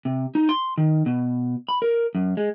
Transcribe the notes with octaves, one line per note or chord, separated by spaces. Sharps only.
C3
D#4
C6
D#3
B2
B5
A#4
F#2
G#3